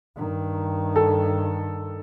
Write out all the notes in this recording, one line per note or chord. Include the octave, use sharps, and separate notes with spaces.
G2 D#3
A4